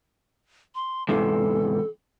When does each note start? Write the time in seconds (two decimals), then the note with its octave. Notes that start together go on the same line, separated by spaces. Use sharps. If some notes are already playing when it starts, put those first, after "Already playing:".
0.75 C6
1.08 E2 G#2 C3 A4